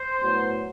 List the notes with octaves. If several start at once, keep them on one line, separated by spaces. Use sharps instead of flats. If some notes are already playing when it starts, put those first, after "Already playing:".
Already playing: C5
A2 F#3 B3